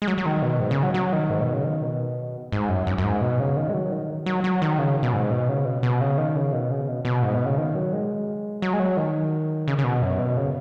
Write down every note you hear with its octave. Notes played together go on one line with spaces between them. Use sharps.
G#3
F#3
F#3
D#3
B2
G#2
C#3
F#3
F#3
D#3
G#2
B2
C#3
D#3
B2
G#2
F#2
F#2
F#2
G#2
B2
C#3
D#3
G#3
F#3
D#3
F#3
F#3
D#3
C#3
B2
G#2
B2
C#3
B2
B2
C#3
D#3
C#3
B2
C#3
B2
B2
G#2
B2
C#3
D#3
F#3
G#3
F#3
G#3
F#3
D#3
C#3
C#3
B2
F#2
B2
C#3